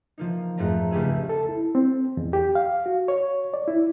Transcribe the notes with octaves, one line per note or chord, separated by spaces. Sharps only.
F3 A#3 D#4
F2 G#2 A3 A#5
C#2 A3 G4 G#4 E6
A4
E4
C4
E2
G4
F5
F#4
C#5
D5
E4